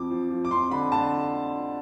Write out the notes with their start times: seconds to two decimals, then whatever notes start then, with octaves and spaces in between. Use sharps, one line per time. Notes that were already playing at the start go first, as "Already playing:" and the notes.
Already playing: F2 F3 D6
0.10 F3
0.31 F3
0.45 D6
0.50 F2 C6
0.71 D3 B5
0.92 D3 A5